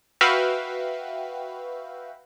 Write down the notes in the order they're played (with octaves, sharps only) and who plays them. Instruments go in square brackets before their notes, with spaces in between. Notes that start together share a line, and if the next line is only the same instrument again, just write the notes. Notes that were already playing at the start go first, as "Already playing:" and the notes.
[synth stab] F#4 B4 E5 F5 G5